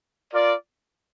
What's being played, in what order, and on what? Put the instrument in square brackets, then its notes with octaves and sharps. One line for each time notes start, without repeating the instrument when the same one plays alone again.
[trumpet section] F4 A#4 D5